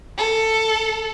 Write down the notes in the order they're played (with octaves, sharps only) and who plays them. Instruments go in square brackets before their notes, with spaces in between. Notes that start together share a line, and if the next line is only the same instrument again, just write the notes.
[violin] A4